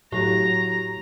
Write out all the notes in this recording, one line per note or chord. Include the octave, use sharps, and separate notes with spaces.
A2 F#3 G4 A#5